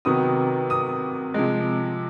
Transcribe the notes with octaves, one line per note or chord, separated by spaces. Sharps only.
C3 D#3 F#3 B3 D#6
D#6
C3 F3 G#3